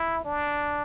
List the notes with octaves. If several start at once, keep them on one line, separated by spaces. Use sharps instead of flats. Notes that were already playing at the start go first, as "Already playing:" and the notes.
Already playing: E4
D4